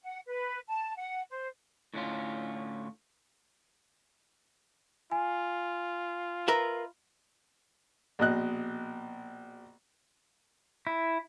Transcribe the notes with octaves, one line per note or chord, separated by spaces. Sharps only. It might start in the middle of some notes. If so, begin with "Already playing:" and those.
F#5
B4
A5
F#5
C5
A2 D3 C#4 F4
F4 G#5
A#4 B4 E5
A#1 B2 D#5 F#6
E4